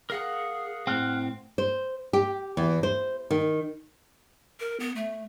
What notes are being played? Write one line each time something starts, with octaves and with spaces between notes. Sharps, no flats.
G#4 A#4 F5 F#5
A2 C4 F#5 F6 F#6
C5
G4
E2
C5
D#3
A#4
B3
A3